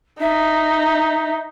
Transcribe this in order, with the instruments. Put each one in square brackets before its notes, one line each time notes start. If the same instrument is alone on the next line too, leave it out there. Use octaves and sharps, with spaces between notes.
[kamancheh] D#4 [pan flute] E5